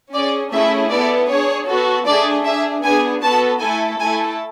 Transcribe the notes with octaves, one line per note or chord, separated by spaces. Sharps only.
C#4 G#4 D5
A3 C#4 E4 G#4 E5
B3 E4 A4 D5
D4 G#4 C#5
B3 F#4 A4
A3 D4 G#4 D5
D4 G#4 E5
B3 D4 G#4 G#5
B3 F#4 A4 A5
A3 E4 A4 G#5
A3 E4 A4 G#5